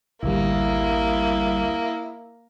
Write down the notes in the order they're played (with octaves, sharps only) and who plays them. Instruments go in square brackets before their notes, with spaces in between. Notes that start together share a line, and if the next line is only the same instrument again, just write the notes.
[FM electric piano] A1 D2 G3 [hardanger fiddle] A#3 [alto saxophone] E4